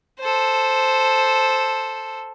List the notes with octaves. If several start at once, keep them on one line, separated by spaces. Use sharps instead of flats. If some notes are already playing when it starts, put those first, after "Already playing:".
A4 C5